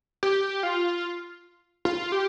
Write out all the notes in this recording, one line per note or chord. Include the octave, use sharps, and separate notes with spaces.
G4
F4
F4
G4